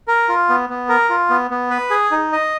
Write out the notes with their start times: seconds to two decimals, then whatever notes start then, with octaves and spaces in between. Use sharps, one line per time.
0.08 A#4
0.29 F4
0.49 B3
0.69 B3
0.89 A#4
1.10 F4
1.30 B3
1.51 B3
1.70 B4
1.91 G#4
2.11 D#4
2.32 D#5